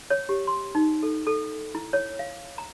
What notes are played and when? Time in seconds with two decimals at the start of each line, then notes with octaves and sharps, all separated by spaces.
0.10 C#5
0.29 G4
0.47 C6
0.75 D#4
1.03 A4
1.27 A4
1.75 E4
1.93 C#5
2.19 F5
2.58 A#5